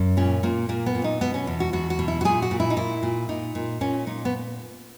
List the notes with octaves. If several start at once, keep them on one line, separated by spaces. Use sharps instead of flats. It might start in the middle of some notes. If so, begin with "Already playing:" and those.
Already playing: F#2
A#2 C#4
A#2 A#3
A#2 A#3
B3
A#2
D#4
B2 B3
C#4
E2
F#4
E2 F#4
F#4
B2
E4
F#4
A#2 G#4
F#4
A#2
E4
D#4
A#2 E4
A#2
A#2 D#4
A#2
A#2 C#4
A#2 D#4
B3